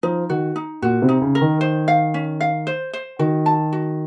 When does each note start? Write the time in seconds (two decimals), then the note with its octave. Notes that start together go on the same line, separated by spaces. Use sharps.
0.03 F3 D#4
0.29 D#3 F#4
0.56 D#4
0.82 A#2 F#4
1.02 C3
1.09 D#4
1.22 C#3
1.35 A#4
1.41 D#3
1.61 C5
1.88 F5
2.14 C#4
2.41 F5
2.67 C5
2.93 C5
3.19 D#3 F#4
3.46 A5
3.73 F#4